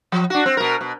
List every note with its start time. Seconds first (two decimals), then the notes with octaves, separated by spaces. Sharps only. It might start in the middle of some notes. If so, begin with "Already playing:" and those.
0.12 F3
0.30 D4 F#4
0.46 C4
0.57 B2 A#4
0.81 B2